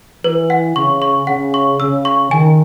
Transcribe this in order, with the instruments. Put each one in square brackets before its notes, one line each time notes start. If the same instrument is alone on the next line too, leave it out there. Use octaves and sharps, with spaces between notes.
[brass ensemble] E3 [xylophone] B4
[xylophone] F#5
[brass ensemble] C#3 [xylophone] C#6
[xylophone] C#6
[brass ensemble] C#3 [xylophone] F#5
[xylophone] C#6
[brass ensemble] C#3 [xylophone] E6
[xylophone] C#6
[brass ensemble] D#3 [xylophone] G#5